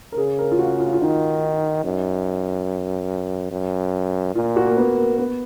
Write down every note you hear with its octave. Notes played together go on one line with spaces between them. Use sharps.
A#4
C#3 G#4
A#4
F4
F#4
F4
F4
D#3 D#4
F#2
F#2
A#2 F4
F#4
A#3
B3
A#3
B3